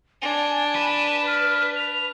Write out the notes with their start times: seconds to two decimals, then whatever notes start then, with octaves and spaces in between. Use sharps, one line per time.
0.22 D4 G#5
0.75 B4 E7
1.27 F6
1.76 F7